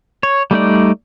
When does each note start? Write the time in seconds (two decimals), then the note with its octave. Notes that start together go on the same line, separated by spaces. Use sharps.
0.23 C#5
0.51 G3 A3 D#4 D5